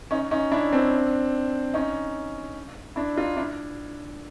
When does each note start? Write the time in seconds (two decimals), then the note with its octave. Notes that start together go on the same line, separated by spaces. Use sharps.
0.11 C#4 D#4
0.31 C#4 D#4
0.52 D4 E4
0.73 C4 D4
1.74 C#4 D#4
2.96 D4 E4
3.16 D#4 F4
3.37 D4 E4